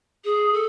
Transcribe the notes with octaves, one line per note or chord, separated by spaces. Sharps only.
G#4
A4